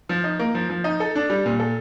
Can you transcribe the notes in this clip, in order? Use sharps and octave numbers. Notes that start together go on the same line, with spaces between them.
F3
D#4
A#3
F3
F3
D#4
A4
D4
G3
A#2
A4